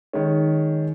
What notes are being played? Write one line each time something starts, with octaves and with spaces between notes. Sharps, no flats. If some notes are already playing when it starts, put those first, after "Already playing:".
D#3 G#3 C#4